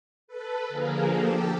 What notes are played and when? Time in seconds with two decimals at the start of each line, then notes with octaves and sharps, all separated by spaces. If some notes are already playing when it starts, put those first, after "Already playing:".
0.28 A4 B4
0.69 D3 F3 A#3 G#4 A#4
1.10 G4 A4